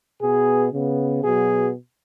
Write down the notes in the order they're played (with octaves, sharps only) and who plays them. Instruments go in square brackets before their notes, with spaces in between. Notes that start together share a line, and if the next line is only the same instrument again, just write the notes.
[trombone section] B2 B3 G#4
C#3 B3
B2 F#3 B3 G#4